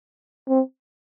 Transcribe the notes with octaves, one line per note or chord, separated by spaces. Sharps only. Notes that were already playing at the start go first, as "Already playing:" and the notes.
C4